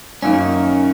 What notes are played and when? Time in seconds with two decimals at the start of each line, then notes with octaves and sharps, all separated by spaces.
0.22 F#2 D#3 A#3 C#4 D#4